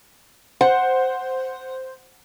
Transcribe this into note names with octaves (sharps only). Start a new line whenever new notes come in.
C5 F#5